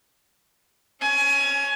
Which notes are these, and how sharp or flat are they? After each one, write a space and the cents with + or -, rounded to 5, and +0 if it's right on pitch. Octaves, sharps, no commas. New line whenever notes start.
C#4 +0 G#5 +25